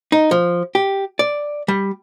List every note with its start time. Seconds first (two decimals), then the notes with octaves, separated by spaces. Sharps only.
0.12 D#4
0.31 F3
0.75 G4
1.19 D5
1.68 G3